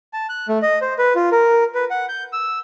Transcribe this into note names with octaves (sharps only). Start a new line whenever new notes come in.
A5
F#6
A3
D#5
C5
B4
F4
A#4
B4
F#5
G6
E6